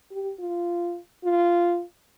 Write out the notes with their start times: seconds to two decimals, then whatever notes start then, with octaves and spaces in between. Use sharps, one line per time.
0.11 G4
0.39 F4
1.24 F4